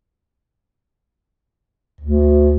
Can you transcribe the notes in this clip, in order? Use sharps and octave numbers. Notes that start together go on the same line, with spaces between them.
D2